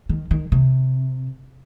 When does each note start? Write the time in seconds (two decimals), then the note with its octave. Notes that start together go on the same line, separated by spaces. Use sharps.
0.09 D#3
0.31 D#3
0.52 C3